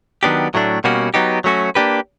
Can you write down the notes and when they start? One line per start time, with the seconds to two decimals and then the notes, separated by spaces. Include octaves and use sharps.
0.23 D#3 F#3 B3 D4 G4
0.54 A2 F#3 A3 D4
0.84 B2 G3 A#3 C#4 F#4
1.14 F#3 B3 D#4 G4
1.44 F#3 A3 C#4 F#4
1.75 A#3 D4 G4 B4